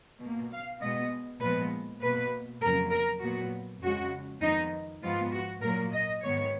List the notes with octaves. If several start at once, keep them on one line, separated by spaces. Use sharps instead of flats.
B2 A#3
F5
B2 G#3 B3 D#5
A#2 F3 G#3 B3 B4
B2 A#3 B4
F2 C#3 F#3 A#3 A#4
A#4
A#2 F#3 B3 F#4
F2 C#3 G#3 F#4
F2 D#3 G#3 B3 D#4
G#2 F3 B3 F4
F#4
A#2 F#3 A#3 A#4
D#5
G#2 D#3 G#3 B3 C#5